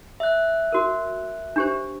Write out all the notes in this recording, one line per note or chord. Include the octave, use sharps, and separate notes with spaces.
E5 F#6
F#4 A#4
D4 G4 C5